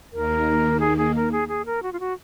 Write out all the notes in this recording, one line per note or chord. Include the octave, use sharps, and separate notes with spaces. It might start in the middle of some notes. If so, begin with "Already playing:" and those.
D#2 D#3 A#3 A#4
G#4
G#4
A#4
G#4
G#4
A#4
F#4
F4
F#4